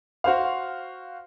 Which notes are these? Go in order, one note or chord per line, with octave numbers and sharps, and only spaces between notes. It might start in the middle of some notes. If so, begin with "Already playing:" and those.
F#4 C5 F5